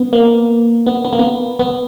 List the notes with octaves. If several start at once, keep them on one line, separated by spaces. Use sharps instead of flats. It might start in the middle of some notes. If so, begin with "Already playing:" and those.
Already playing: B3
A#3
B3
B3
A#3
B3
B3